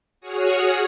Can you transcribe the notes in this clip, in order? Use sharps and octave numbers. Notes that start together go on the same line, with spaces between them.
F#4 G#4 C#5 F#5 D#6 F6